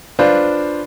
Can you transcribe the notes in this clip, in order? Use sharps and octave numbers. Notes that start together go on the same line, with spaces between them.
D4 F4 B4 C5